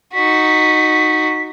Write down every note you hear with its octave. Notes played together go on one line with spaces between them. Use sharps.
D#4 F#4 B6